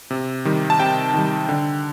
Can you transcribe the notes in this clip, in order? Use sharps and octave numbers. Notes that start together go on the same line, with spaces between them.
C3
D#3 G3
A5
C3 G5
D#3 G3
D3